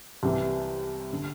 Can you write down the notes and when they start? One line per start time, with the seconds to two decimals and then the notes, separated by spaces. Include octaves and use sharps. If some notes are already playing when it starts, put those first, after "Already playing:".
0.23 C2 C3 E3 G3
1.13 D3